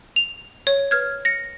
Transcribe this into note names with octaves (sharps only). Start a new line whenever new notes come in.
F7
C#5
B4 F6 G#6
A#6 C#7